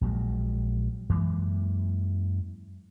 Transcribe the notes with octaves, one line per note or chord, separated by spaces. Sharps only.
A#1 A#2 F#3 G#3
F#2 E3 G#3 A#3